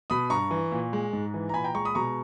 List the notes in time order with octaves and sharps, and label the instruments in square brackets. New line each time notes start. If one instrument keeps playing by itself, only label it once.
[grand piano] B2 B5 D#6
G2 A#5 C#6
E3
A#2
G#3
G#2
E3
A#5
A#2 G#5 B5
G5 A#5
G#3 A#5 C#6
B5 D#6
B2 A#5 C#6